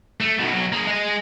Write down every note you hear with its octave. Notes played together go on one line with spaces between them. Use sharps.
A3
B2 D#3
B1 F#3
A#3 G#4
G#3 D#5